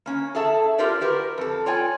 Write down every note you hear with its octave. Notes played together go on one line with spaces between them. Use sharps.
A#3 C#4
G#4 A4 E5 A5
F4 G4 A#4 C5 D5 F5
F#4 G4 A#4 B4
F2 A4
F4 C#5 D5 G5 G#5